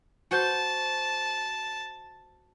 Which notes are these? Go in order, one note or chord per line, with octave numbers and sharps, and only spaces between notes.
F#4 C5 A5 G6